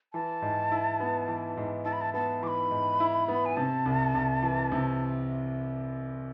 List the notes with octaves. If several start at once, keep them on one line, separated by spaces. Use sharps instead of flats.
E3 A5
G#2
E4
B3
E3
G#2
E4 A5
B5
A5
B3 A5
E3 D6
B5
G#2
E4
B3
G#5
C3 A5
C2
C2
E3
C3